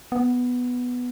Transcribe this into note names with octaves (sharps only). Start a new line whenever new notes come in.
B3